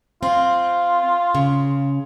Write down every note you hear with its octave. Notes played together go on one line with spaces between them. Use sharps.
C4 F4
C#3